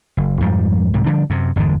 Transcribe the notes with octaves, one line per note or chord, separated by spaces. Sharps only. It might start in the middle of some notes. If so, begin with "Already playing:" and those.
F#1
F2 G#2 F3 G3
C2 G#2 C3
D3 F3 G3 D4
F#2 C3
G1 E2 G#2 D3